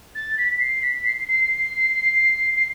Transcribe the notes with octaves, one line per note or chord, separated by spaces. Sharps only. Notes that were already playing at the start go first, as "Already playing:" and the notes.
A6
B6
C7
B6
C7
C7
C7